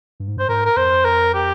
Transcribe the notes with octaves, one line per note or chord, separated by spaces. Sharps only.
G2
G#2
G2 C5
G#2 A#4
A#4
F2 C5
A#4
G4